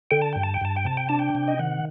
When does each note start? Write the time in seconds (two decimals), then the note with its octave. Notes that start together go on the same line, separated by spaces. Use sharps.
0.11 D3 G5
0.22 A5
0.33 G2 G5
0.43 A5
0.54 G5
0.61 G2 A5
0.76 G5
0.85 C3 A5
0.97 G5
1.09 D4 A5
1.19 G5
1.35 C3
1.48 D#5
1.59 D#3 F#5